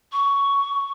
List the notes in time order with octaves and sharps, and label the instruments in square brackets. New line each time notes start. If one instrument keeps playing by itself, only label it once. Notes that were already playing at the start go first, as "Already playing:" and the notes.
[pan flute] C#6